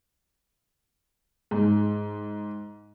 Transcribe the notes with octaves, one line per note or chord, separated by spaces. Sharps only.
G#2